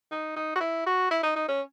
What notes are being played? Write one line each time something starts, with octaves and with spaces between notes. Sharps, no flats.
D#4
D#4
F#4
E4
F#4
E4
D#4
D#4
C#4